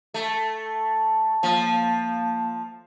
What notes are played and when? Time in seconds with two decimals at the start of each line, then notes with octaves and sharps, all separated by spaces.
0.14 A3
1.43 F3 A#3 F5 A5